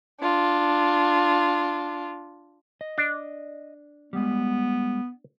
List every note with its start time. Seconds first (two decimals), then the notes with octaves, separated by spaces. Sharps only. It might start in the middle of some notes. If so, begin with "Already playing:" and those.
0.21 D4 F4
2.81 D#5
2.98 D4
4.13 G3 G#3 B3